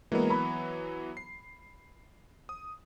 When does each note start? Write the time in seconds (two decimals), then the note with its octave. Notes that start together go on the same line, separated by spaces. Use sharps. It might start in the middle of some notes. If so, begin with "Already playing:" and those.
0.12 E3 F#3 G#3 A#3 B3 A#4
0.30 B5
1.17 C7
2.49 D#6